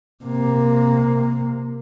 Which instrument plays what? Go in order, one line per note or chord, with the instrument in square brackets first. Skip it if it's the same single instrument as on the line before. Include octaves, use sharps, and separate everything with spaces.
[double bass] C3 A#3